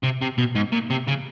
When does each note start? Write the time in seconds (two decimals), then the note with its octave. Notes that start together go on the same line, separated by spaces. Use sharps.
0.04 C3
0.22 C3
0.38 B2
0.55 G#2
0.72 A#2
0.90 C3
1.07 C#3